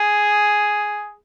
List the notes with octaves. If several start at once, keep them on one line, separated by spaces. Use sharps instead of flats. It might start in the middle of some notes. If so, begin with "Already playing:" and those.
Already playing: G#4